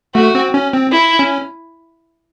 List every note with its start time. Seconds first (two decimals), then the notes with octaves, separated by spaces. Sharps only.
0.15 A3 F#4
0.35 C4
0.54 C#4
0.73 C4
0.93 E4
1.19 C#4